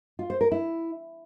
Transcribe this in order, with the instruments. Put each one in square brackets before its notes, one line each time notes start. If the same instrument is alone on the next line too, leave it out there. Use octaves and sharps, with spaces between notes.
[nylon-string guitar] F4
C5
A#4
E4